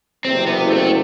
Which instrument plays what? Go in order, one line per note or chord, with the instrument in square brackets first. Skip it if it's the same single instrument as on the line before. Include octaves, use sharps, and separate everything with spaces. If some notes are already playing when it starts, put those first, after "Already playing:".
[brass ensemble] F#1 E2 C3 [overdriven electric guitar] C4
[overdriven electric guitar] B3
A3